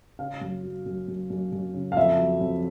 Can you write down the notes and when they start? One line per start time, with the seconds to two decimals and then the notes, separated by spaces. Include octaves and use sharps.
0.19 C#3 F5
0.41 F#2
0.63 F#3
0.86 F#2
1.08 F#2
1.30 F#2
1.52 F#2
1.74 C#3
1.92 F5
1.97 F2 E5
2.18 F#3
2.41 F2